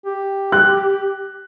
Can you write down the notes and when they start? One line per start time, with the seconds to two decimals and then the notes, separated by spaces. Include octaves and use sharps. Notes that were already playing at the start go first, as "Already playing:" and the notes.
0.06 G4
0.52 F#6